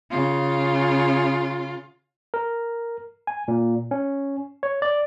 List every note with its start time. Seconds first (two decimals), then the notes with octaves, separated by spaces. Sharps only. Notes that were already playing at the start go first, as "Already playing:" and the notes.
0.11 C#3 F4
2.34 A#4
3.27 G#5
3.48 A#2
3.91 C#4
4.63 C#5
4.82 D5